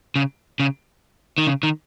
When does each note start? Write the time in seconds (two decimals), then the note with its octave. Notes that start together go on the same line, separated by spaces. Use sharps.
0.16 C#3
0.60 C#3
1.38 D#3
1.47 C#3
1.63 D#3